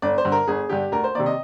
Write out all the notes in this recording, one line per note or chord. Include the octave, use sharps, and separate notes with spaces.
G1 D5
C5
G2 D3
A#4
G1 G#4
G2 D3 G4
D2 A#4
C5
C3 D#3 A#3 D5
D#5